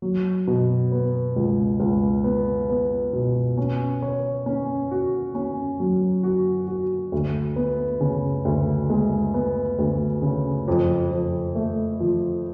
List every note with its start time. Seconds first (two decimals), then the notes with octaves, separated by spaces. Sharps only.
0.02 F#3
0.47 B2
0.92 B3
1.36 C#2
1.80 C#2
2.24 B3
2.69 B3
3.13 B2
3.57 C#4
4.02 C#5
4.46 C#4
4.91 F#4
5.35 C#4
5.80 F#3
6.23 F#4
6.67 F#4
7.12 D2
7.56 B3
8.00 C#3
8.45 D2
8.90 G#3
9.34 B3
9.79 D2
10.22 C#3
10.68 F2
11.11 F2
11.55 A3
12.00 F3